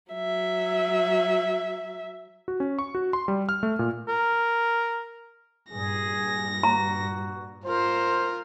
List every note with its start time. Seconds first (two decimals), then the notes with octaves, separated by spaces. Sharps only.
0.13 F#3 E5
2.48 F#4
2.60 C#4
2.79 C#6
2.95 F#4
3.13 C6
3.28 G3
3.49 F6
3.63 A3
3.79 A#2
4.09 A#4
5.71 G2 A#2 G3 G#4 A#6
6.63 F#4 A#5
7.64 F4 A#4 C5